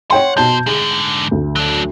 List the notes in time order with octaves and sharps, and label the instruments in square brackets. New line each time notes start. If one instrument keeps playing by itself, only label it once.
[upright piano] C#5 G5 C6 [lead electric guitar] F#5
[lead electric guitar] F2 C5 [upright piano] B2 A5 G6
[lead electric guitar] G#2 D3 [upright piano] G#4
[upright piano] D2
[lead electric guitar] F#3 D4